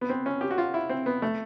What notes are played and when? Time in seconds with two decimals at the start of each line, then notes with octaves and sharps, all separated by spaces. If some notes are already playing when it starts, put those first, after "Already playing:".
0.01 B3
0.10 C4
0.26 C#4
0.41 G4
0.51 F#4
0.58 F4
0.74 E4
0.89 C4
1.06 B3
1.22 A3